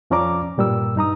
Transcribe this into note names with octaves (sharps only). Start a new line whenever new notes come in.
F2 F3 C#4 D5 A#5 D6
G2 A#2 G3 A#4 E6
G2 D#4 A#5 D#6